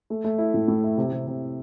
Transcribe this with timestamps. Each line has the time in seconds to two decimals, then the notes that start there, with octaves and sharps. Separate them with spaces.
0.10 A3
0.24 A3
0.38 E4
0.54 A2
0.68 A2
0.84 E4
0.98 C3
1.12 C3
1.27 C3